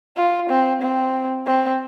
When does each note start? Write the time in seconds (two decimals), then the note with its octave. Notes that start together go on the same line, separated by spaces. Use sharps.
0.17 F4
0.50 C4
0.81 C4
1.46 C4